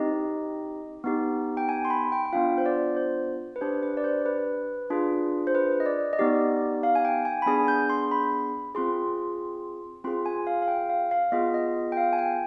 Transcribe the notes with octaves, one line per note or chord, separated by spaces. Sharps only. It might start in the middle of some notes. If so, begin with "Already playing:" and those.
Already playing: C4 D#4 G4 D#5
B3 D#4 G4
G5
G#5
C6
B5
G5
G5
B3 D4 F4 F5
C5
D5
C5
B4
D4 G4 C5
B4
D5
C5
B4
D4 F4 G#4
C5
B4
D#5
D5
D#5
B3 D#4 G4 D5
F5
G#5
G5
G#5
B5
B3 D4 G#4 G#5
G6
C6
B5
C4 F4 G#4 C6
C4 F4 G#4 C6
G#5
F5
F5
G5
F5
F5
B3 F4 G#4 D#5
D#5
G5
F5
G#5
G5